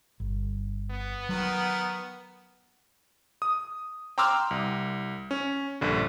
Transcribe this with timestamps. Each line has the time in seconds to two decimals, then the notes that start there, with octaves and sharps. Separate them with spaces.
0.20 G1
0.90 B3
1.29 D#3 F#3 F#5
3.42 D#6
4.18 G5 A#5 C6 D6 E6 F6
4.51 C2
5.31 C#4
5.81 A#1 G2 D3